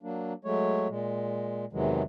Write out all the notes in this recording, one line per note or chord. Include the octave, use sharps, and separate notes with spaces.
F#3 A#3 D4
F#3 G#3 A3 C#5
A#2 G#3
E2 C3 D#3 E3 F#3 G#3